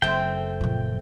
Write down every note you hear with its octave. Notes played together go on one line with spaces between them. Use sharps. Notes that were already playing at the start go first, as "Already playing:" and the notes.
F#1 A3 C4 G5
A#2 F3